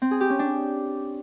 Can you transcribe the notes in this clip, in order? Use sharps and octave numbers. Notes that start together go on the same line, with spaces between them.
C4
G#4
G4
C#4
D4